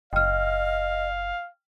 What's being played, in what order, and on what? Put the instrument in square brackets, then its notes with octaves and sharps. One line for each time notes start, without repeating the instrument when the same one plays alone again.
[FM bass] F#1 [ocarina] D#5 [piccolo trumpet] F5 [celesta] G5 F6